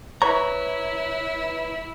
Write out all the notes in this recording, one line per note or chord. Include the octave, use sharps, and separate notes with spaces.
E4 B4 C#5 A#5 C#6